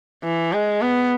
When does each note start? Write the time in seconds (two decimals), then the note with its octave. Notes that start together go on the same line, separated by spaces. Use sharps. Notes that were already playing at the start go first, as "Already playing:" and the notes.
0.24 E3
0.53 G#3
0.82 B3